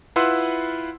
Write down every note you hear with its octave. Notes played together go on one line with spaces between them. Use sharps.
E4 F4 B4 F#5 C6 E6